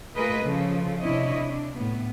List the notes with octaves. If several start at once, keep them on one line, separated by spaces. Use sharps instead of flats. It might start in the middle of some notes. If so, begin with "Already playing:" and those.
A3 F4 G#4 A#4 B4 D#5
C#3 F3 A4
C3 D4 E4 C#5 D#5
D4
A2 B3